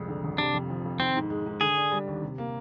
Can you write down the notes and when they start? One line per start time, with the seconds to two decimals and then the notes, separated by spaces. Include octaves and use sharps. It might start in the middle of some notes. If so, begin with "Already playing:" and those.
Already playing: C2 F2 G#3
0.08 D3
0.24 G1
0.38 C3 D4
0.54 F2
0.70 F3
0.85 F2
1.00 D#3 C4
1.16 G#2
1.30 G#3
1.46 G#2
1.61 D3 G#4
1.77 D4
1.92 G3
2.07 D#2
2.22 C3
2.38 A#3